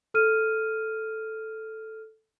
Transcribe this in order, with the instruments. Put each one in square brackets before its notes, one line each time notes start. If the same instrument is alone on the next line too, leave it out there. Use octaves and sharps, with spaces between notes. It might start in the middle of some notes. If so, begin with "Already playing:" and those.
[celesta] A4 F6 D#7